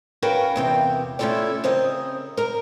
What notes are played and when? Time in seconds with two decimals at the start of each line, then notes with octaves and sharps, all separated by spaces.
0.22 C#4 F#4 A#4 B4 F5 G5
0.56 E2 C3 G5
1.19 A3 C#4 E4 F4 A4 D5
1.64 C#3 C4 A#4 D#5
2.37 A#4 A#5